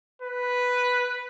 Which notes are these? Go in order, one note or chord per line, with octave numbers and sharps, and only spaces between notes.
B4